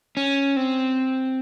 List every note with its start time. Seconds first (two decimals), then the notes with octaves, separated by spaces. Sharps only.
0.17 C#4
0.57 C4